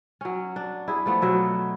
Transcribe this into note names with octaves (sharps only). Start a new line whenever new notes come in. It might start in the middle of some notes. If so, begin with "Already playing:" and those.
F#3 C#4
D4
E4 G#4
F3 A3 B3
B2 F#3 E5